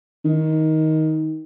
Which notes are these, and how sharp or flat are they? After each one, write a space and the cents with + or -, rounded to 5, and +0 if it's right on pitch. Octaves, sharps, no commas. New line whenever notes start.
D#3 +15